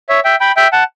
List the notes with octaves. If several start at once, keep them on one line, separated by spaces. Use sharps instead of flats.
C#5 E5
E5 G5
G5 B5
E5 G5
F#5 A5